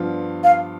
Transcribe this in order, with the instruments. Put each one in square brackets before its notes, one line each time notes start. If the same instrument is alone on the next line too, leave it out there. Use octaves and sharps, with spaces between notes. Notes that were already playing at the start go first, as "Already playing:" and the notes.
Already playing: [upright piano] G2 F3 B3 D4 F4
[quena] F5